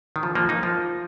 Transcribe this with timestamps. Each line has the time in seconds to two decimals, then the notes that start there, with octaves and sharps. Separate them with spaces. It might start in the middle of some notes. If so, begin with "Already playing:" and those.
0.16 D#3
0.23 F3
0.35 F3 A#3
0.49 A#3 D#4
0.63 F3